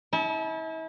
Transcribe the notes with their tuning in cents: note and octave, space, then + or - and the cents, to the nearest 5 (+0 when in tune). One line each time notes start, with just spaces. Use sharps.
E4 -40 A5 -35